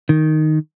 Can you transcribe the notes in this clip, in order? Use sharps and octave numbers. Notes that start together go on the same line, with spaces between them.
D#3